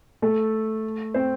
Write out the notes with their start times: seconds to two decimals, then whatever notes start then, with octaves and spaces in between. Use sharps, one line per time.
0.22 A3 A4
1.14 C4 C5